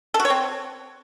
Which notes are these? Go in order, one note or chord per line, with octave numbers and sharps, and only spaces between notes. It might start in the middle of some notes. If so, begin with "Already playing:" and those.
A4
F#4
C#5
C4